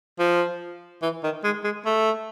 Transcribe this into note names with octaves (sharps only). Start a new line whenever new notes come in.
F3
E3
D#3
G#3
G#3
A3